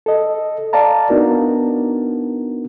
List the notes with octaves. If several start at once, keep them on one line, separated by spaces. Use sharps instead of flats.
A4 D#5
D5 F5 A5 A#5
B3 D4 D#4 F#4 A#4